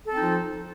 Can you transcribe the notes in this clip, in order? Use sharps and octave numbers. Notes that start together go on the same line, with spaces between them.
F3 C4 D#4 F4 A4